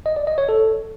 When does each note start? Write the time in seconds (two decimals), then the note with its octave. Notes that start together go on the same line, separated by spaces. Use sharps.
0.06 D#5
0.16 D5
0.27 D#5
0.38 C#5
0.49 A4